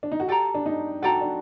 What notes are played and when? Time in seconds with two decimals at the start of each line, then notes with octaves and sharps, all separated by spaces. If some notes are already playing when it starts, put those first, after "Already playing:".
0.03 D4
0.12 D#4
0.20 F#4
0.28 G4 A4 D5 G5 A#5
0.54 D4
0.66 D#4
1.02 F#4 A4 D5 G5 A#5
1.21 D4